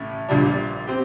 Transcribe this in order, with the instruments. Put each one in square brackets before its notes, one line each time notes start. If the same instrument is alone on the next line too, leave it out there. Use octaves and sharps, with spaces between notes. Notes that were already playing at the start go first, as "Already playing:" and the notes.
Already playing: [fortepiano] A1 A2 A3
A#1 A#2 G3 D4
C4 G4